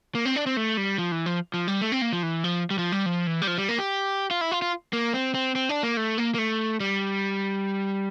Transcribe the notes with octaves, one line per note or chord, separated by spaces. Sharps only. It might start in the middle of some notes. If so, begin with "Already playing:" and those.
A#3
C4
D4
C4
A3
G3
F3
E3
F3
F3
G3
A3
C4
A#3
F3
E3
F3
G3
F3
G3
F3
E3
G3
F3
G3
A#3
G4
F4
E4
F4
F4
A#3
C4
C4
C4
D4
A#3
A3
A#3
A#3
A3
G3